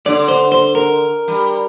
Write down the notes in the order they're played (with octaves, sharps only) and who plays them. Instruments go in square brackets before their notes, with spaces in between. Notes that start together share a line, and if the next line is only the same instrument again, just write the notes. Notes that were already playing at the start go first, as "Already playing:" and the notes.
[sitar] D3 [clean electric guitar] D5
[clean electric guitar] C5
C5
A#4
[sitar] G3